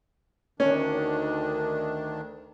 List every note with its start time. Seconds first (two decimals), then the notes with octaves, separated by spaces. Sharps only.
0.60 D2 D#3 C#4 D4